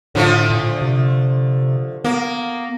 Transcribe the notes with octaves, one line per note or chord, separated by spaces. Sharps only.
A2 D3 F3 A3
A#2
C3
A#3 B3